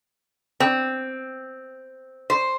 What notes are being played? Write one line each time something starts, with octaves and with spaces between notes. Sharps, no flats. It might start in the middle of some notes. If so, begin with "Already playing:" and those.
C4
C5